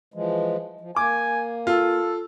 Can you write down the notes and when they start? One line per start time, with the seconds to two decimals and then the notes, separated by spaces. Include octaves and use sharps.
0.14 E3 F3 G#3
0.81 F3
0.96 A#3 G#5 D6
1.67 F4 A4